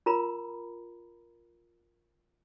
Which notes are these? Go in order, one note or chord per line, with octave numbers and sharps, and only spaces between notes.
F4 A#4 A#5 B5